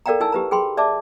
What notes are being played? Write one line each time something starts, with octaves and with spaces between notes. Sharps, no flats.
A4 A#4 D5 F5 G5 A#5
D#4 E4 G#5 A5 E6
G4 B4 A#5
G#4 G5 B5 C6
D5 E5 A5 D6